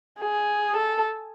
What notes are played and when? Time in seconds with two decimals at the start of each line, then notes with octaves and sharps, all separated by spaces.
0.20 G#4
0.77 A4